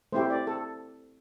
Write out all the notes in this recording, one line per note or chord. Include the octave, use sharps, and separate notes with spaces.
A3 C4 E4 G4 C5
D5
A4